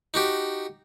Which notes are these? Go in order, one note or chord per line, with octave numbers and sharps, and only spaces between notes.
D#4 F#4 G4